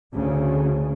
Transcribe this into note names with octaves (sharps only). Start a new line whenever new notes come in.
D2 C#3